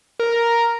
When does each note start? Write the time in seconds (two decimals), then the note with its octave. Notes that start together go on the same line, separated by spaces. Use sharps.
0.20 A#4